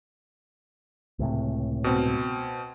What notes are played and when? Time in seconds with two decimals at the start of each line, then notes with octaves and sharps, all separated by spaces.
1.19 C#2 A2 C3
1.84 B2 C4